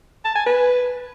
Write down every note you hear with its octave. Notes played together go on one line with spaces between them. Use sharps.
A5
G#5
B4